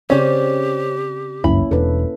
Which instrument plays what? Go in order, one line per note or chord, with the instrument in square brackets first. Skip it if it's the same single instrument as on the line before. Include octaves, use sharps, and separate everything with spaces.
[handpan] C#3 C4 D5 [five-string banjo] C#4 C5 [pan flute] G4
[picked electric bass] G1 C#2 F#2 [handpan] A#3 C#4 E4 [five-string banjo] B5
[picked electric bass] E1 D4 [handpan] A4 B4